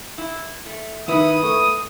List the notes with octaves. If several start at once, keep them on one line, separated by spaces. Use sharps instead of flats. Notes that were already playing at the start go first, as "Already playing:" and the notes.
E4
A3
D#3 B3 E4 B4 E5 D#6
A3 C#6